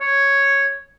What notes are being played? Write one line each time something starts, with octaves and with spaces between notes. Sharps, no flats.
C#5